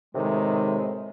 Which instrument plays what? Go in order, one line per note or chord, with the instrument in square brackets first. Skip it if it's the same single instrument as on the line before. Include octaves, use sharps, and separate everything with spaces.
[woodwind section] A2 C3 [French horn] D#3 [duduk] G#3